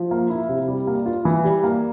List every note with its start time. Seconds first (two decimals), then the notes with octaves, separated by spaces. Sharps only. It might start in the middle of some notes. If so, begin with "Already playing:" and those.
Already playing: F3
0.11 A#3
0.30 E4
0.49 C3
0.68 G3
0.87 A#3
1.06 F4
1.25 E3
1.44 G3
1.64 A#3